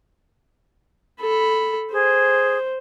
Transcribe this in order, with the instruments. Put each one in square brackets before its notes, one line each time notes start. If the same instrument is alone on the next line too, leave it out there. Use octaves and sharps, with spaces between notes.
[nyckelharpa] A4 B5
[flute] G#4 [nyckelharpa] C5